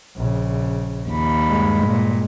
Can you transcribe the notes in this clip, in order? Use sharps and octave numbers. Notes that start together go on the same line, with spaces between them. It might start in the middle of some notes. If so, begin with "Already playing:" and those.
A#1 C#3
D#2 B5
G2 G#3
A#2